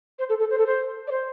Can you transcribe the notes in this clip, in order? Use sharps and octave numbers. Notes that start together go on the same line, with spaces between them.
C5
A4
A4
C5
A4
C5
D5
C5